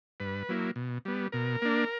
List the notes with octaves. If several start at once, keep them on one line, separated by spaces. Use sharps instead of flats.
G2 B4
F#3 A#3 E4
B2
G3 B3
B2 A#4
A#3 D4